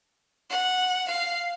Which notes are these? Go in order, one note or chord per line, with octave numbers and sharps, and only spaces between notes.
F#5
F5